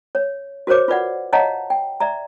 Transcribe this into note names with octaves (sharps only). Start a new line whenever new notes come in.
C#5
F#4 A#4 C5 C#5 D6
F4 B4 D5 F#5
C#5 D#5 F5 F#5 A5 A#5
G5
D5 E5 A#5